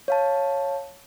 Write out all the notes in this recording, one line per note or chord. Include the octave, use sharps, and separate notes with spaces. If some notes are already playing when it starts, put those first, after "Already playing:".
C#5 F5 A5